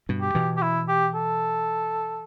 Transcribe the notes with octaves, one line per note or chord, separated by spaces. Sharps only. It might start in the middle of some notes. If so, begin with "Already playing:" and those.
G2 B2
G4
B2 E3
G4
E4
G4
A4